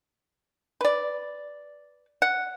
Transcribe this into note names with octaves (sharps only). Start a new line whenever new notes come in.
B4 D5
F#5